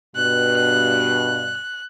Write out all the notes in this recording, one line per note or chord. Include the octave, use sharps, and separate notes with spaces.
G2 B2 F#6